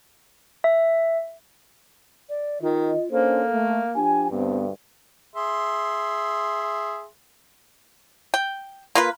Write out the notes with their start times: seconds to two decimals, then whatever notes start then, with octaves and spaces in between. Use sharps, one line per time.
0.64 E5
2.29 D5
2.62 D#3 F4 D#5
3.11 A#3 C#4 D4 A4 C5
3.53 A3
3.95 F3 D4 G4 G#5
4.31 D2 G2 B3 C4
5.36 G#4 E5 C6
8.34 G5
8.95 A#3 F4 B4